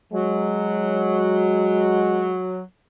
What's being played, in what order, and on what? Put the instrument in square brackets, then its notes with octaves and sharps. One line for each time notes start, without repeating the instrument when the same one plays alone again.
[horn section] F#3 [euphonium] G#3